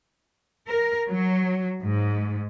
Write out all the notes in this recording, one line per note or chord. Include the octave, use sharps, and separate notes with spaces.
A#4
F#3
G#2